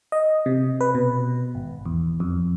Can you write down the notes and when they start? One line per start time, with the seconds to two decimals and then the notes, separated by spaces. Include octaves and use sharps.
0.12 D#5
0.46 C3
0.81 B4
0.95 B2
1.55 G#1
1.86 E2
2.20 F2